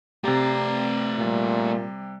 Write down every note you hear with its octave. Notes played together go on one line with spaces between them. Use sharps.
C3 A3 C4 G4 D5 A#5
A#2 G3